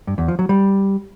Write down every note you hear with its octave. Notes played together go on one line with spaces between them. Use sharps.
G2
E2
F3
F#3
G3